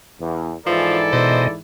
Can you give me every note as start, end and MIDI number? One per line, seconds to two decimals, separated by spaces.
0.19 0.55 40
0.67 1.61 44
0.67 1.61 52
0.67 0.99 53
0.67 1.55 64
0.67 1.55 69
0.67 1.55 74
1.13 1.48 47
1.13 1.43 72
1.13 1.48 75